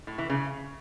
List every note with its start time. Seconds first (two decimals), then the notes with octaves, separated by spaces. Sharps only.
0.07 A2
0.18 E3
0.29 C#3